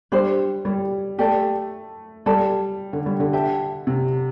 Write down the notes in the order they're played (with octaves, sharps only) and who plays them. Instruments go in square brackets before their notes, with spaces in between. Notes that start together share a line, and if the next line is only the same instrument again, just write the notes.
[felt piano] G3 [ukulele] D4 G4 C5
[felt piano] G3
[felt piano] A3 [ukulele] G4 D5 A5
[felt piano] G3 [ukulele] A4 D5 A5
[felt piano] D3
G3
D3
[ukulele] G4 E5 A5
[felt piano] C3